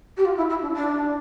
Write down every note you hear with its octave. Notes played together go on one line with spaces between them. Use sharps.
G4
F4
E4
E4
D4
D4